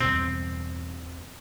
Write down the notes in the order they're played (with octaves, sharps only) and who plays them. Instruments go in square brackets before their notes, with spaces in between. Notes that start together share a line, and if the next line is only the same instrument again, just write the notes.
[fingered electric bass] E2 G2 B2 [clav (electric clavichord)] C4